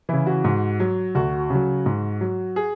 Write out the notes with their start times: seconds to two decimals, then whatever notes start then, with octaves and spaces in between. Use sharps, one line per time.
0.09 C#3 E3 E4
0.26 F#4
0.44 G#2
0.80 F#3
1.15 D2 F#4
1.50 C#3 F#3
1.86 G#2
2.21 F#3
2.56 G#4